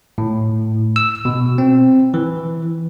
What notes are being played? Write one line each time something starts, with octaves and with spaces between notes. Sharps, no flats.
A2
E6
B2
C4
E3